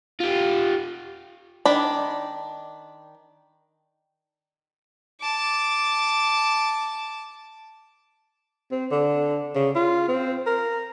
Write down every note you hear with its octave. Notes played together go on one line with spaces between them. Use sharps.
F4 G4
D#3 D4 B5
A5 D6
C4
D3
C#3
F4
C4
A#4